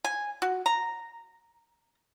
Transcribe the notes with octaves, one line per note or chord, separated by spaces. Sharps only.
G#5
F#4
A#5